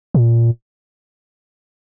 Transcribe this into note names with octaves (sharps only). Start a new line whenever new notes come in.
A#2